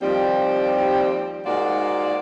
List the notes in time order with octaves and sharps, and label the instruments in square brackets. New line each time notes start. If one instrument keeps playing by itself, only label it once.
[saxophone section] D#2 F3 G3 C4 G4
G#2 A#3 F4 F#4 D5